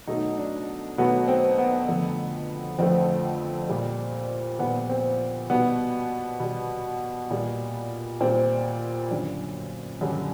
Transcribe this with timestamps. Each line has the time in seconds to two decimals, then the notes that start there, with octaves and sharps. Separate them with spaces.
0.07 B2 F#3 A3 D#4
0.38 D4
0.98 B2 F#3 A3 B3
1.28 C4
1.58 B3
1.88 F2 D3 F3 A3
2.79 F2 D3 F3 A3 C4
3.69 A#2 G3
4.59 A#2 G3 B3
4.89 C4
5.50 B2 G3 B3
6.40 B2 G3
7.31 A#2 G3
8.21 A#2 G3 C4
9.11 F#2 D3 G3 D4
10.01 F#2 D3 G3